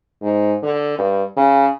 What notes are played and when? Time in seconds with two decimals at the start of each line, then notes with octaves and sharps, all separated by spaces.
0.22 G#2
0.63 D3
0.98 G2
1.37 C#3